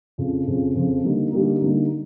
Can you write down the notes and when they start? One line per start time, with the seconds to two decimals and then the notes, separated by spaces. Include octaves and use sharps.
0.18 F2 C#3 F3
0.47 F2 C#3 F3
0.75 F2 C#3 F3
1.04 D3 G3 A#3 D#4
1.32 D3 G3 A#3 D#4
1.61 D3 G3 A#3 D#4